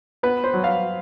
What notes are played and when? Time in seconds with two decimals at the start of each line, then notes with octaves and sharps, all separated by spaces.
0.23 B3 B4
0.44 C5
0.54 F#3
0.64 F5